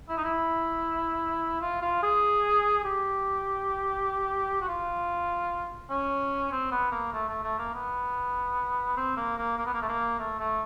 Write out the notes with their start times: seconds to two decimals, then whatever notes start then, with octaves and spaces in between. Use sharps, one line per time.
0.09 E4
0.18 D#4
0.24 E4
1.62 F4
1.82 F4
2.03 G#4
2.84 G4
4.61 F#4
4.68 F4
5.90 C#4
6.52 C4
6.72 B3
6.92 A#3
7.13 A3
7.29 A3
7.43 A3
7.59 A#3
7.74 B3
8.97 C4
9.17 A#3
9.38 A#3
9.58 A#3
9.66 B3
9.73 A#3
9.82 A3
9.88 A#3
10.19 A3
10.39 A3